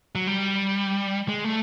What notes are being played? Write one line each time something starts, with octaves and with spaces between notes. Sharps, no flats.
F#3
G3
G#3
A3